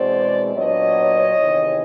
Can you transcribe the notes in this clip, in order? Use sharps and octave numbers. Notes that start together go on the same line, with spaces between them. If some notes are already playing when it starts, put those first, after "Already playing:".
Already playing: E2 B2 G#3 C4 C5 D5
A#2 F#3 B3 D4 C#5 D#5
E2 C3 D#3